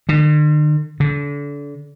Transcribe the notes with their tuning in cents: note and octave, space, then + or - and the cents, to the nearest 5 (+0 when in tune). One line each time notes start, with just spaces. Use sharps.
D3 +45
D3 -30